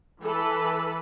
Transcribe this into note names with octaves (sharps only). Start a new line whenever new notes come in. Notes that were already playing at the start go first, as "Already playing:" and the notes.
E3 A4 B4 B5